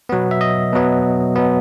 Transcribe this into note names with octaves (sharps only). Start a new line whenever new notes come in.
B2 F#3 B3
E5
D#5
B2 F#3 B3
B2 F#3 B3